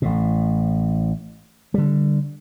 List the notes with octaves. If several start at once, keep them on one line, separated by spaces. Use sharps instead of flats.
A1 A2
D3 G3